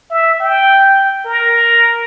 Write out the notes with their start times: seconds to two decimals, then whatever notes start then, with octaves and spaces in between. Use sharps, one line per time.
0.11 E5
0.40 G5
1.26 A#4